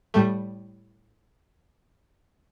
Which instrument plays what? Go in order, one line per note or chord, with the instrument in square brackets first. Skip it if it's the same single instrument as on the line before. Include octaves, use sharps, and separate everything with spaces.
[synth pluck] A2 G3 A3